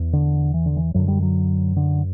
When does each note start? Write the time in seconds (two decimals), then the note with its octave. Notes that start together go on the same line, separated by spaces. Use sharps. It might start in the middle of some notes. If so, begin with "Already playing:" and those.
Already playing: E2
0.13 D3
0.54 E3
0.66 D3
0.76 E3
0.94 F#2 D3 F#3
1.08 G3
1.22 F#3
1.76 D3